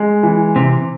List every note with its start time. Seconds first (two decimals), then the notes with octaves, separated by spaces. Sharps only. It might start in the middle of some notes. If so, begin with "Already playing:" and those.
Already playing: G#3
0.23 E3
0.55 C3 C4